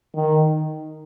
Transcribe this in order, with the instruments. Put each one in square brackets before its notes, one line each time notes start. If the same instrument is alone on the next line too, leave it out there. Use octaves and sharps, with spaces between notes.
[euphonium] D#3